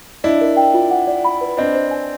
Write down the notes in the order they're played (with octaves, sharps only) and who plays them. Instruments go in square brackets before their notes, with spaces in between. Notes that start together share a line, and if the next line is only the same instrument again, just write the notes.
[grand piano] D4 E4 [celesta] D#5
[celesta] A#4
G5
F4
F#5
D5
B5
B4
[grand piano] C4 D4 [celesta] D#5
[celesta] C5
G#5